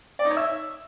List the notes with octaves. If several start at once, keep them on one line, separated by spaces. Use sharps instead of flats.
D5
D#4
C#5
E5